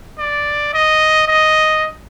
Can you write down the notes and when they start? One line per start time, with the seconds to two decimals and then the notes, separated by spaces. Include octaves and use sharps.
0.18 D5
0.74 D#5
1.27 D#5